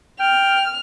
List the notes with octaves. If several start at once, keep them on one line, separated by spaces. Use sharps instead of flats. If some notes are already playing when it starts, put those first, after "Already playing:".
G5 F6